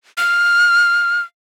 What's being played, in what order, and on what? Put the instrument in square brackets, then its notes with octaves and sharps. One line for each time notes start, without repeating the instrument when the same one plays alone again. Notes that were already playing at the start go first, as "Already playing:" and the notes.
[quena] F6